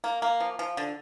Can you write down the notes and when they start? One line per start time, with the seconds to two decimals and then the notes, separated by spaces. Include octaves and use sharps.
0.04 A#3
0.22 A#3
0.40 F3
0.59 F3
0.77 D3